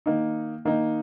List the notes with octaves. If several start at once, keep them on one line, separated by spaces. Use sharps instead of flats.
D#3 A#3 D#4
D#3 A#3 D#4